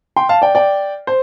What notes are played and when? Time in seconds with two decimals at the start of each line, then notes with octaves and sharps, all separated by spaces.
0.16 G5 C6
0.29 F5 A5
0.42 D5 G5
0.55 D5 G5
1.07 C5